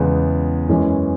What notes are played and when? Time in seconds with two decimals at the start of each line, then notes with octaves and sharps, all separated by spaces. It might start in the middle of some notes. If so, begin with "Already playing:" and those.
Already playing: E2 C#3 G#3 B3
0.69 F#2 E3 G#3 C#4